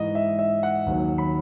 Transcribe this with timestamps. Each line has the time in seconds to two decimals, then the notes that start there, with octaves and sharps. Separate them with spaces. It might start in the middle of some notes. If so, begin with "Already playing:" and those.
Already playing: G#2 E3 D#5
0.15 E5
0.39 E5
0.63 F#5
0.86 D#2 D#3 F#3
1.18 B5